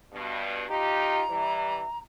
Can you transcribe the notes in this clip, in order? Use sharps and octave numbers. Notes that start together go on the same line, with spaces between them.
G2 B2
D#4 F4 G4 A#5
E3 G3